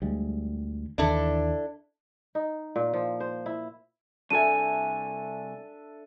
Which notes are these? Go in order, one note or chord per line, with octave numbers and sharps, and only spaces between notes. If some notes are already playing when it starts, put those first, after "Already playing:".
D2 G3 G#3
D#2 D3 E3 D4 E4 A4
D#4
A#2
F3
C5
E4
C2 D4 A4 E5 G#5 D#7